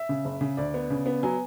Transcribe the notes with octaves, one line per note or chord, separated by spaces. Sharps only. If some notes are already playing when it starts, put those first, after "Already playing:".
Already playing: E5
C#3
F#1
C#3
D2 D5
B3
C#3
B3
F#3 G#5